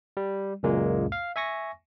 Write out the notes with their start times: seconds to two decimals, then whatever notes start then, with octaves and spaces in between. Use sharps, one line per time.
0.17 G3
0.63 C#2 F#2 A#2 G#3 A#3
1.12 F5
1.36 E5 G#5 C#6 A#6